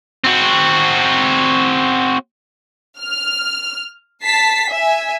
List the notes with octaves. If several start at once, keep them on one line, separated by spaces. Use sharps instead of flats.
C4 F#4
F6
A5 B6 C7
E5 G#5